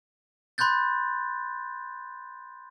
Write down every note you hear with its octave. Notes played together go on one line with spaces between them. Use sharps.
B5 C6 F#6 G6 A6